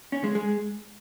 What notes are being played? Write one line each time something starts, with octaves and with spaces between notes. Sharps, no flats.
C#4
G#3
G#3